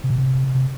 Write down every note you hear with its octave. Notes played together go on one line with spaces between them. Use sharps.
C3
B2
C3
C3